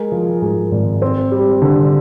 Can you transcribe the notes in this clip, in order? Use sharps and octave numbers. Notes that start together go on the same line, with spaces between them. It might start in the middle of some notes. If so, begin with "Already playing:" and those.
Already playing: G#3 G#4 A#4
F3
G#2 G#4 A#4
G#1
C4
G3
D3